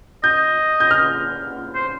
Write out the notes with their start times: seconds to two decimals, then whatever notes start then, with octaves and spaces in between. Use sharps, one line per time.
0.23 D#5 G6
0.80 G6
0.91 F6
1.75 C5